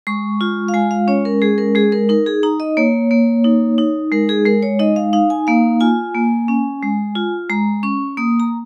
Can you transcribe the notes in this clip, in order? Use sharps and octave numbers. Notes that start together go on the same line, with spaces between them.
G#3 C#6
F4
F5
G#3 G#5
F5
C#4 C#5
A#4
G#3 G#4
A#4
G#3 G#4
A#4
D#4 A#4
G#4
D#4 A#5
D#5
A#3 C#5
A#3
D#4
D#4
G#3 A#4
G#4
G#3 A#4
C#5
D#4 D#5
F5
D#4 F5
G#5
A#3 F5
F4 G#5
A#3
C#4
G#3
F4
G#3 A#5
C#4 C#6
A#3 D#6
A#5